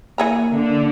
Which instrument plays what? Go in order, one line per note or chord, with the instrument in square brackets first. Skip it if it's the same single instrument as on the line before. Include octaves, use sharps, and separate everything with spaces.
[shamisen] E3 G#4 A#5 [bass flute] A#3
[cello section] D3